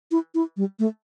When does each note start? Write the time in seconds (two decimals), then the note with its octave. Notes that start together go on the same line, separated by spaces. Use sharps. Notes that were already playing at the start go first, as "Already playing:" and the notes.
0.11 E4
0.34 E4
0.57 G3
0.79 A3